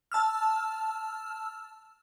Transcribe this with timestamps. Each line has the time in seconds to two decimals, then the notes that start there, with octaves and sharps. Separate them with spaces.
0.12 A5 E6 F6